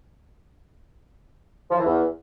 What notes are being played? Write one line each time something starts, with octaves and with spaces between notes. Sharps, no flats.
F3
E3
E2